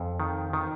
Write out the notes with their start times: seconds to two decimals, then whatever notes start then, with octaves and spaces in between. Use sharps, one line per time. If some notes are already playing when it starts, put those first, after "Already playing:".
Already playing: F2
0.20 D#3
0.53 D#3